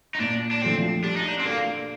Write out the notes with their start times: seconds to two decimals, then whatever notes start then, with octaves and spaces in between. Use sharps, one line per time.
0.15 D#4
0.20 A#2 D4
0.51 D4
0.62 F3 A3 C4 D4
1.03 G3 D4
1.16 D#4
1.28 D4
1.39 C4
1.45 A#3 D4 A4 D5